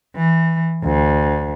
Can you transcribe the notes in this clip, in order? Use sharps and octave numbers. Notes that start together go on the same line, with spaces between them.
E3
D2